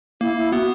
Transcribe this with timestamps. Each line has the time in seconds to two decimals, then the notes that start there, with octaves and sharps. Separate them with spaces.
0.21 A#3 E4
0.37 E4
0.52 B3 F#4